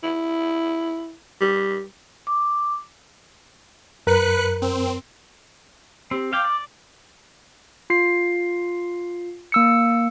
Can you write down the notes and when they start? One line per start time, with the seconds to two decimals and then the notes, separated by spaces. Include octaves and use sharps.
0.04 E4
1.41 G3
2.27 D6
4.07 F#2 A#4 B4 F#6 C#7
4.62 C4
6.11 C4 G4
6.33 F5 G5 D6
6.45 D5
7.90 F4 C7
9.52 A#3 E6 C#7